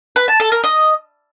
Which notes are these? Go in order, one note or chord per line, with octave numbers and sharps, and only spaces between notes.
B4
A5
A4
A#4
D#5